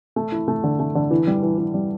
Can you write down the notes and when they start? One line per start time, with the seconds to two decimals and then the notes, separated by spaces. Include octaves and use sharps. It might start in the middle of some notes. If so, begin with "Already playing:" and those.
0.16 A3
0.32 E4
0.48 A3
0.64 D3
0.79 A3
0.95 D3
1.11 E3
1.27 G3
1.43 E3
1.58 E3
1.74 G3